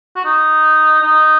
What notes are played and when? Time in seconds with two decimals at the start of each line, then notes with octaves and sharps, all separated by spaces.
0.16 F#4
0.25 D#4
1.02 D#4